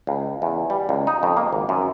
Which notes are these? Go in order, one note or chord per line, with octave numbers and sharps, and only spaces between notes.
C#2
E2
G3
C#2
D#4
F2
A#3
G#1
F#2